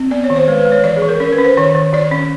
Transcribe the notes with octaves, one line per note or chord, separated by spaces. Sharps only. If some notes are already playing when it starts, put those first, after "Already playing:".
Already playing: C4
B3 D5
C#5
D#3
C5
G#3 B4
B4
G#3
C#5
E3 D5
G#4
E3
A#4
C#4 A#4
B4
C#4
C5
D#3 C#5
D#3
D#3 D5
C#4